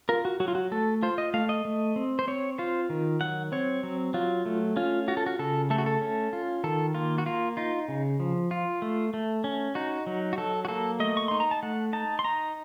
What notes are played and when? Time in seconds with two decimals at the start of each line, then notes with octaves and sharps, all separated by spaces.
0.09 F4 A#4
0.25 F#4
0.40 F#3 F#4
0.48 F4
0.55 F#4
0.72 A3 A4
1.03 F4 C5
1.18 D#5
1.34 A3 F5
1.49 D#5
1.65 A3
1.96 C4
2.19 C5
2.27 C4 C#5
2.58 F4 C5
2.90 D#3
3.21 F#3 F#5
3.52 C4 C#5
3.83 F#3
4.14 F#3 F4
4.46 A3
4.76 C#4 F4
5.08 F4 F#4
5.17 A4
5.26 F#4
5.39 C#3 A4
5.70 A3 A4
5.78 F#4
5.86 A4
6.01 C#4
6.33 F4
6.64 D#3 A4
6.94 A#3 F4
7.18 F#4
7.26 A#3 F4
7.57 D#4 F4
7.88 C#3
8.20 F3
8.51 F4
8.82 A3
9.14 A3
9.44 C#4
9.75 D#4 F#4
10.07 F#3
10.33 F#4
10.38 F#3 A4
10.65 F#4
10.68 A#3 A4
11.00 A3 D#5
11.17 C#6
11.28 D#4 C6
11.40 A#5
11.51 A5
11.63 A3 F#5
11.93 D#4 A5
12.19 C6
12.24 D#4 A#5